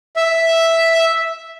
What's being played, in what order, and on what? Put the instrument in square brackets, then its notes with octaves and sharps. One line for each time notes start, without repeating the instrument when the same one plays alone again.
[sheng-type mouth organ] E5